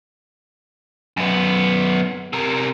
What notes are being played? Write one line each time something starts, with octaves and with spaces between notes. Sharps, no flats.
F#2 B3
C3 A#4